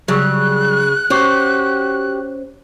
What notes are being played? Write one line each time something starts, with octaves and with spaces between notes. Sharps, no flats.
C#3 F#3 G3 F#6
C#4 F#4 G4 C5 C#5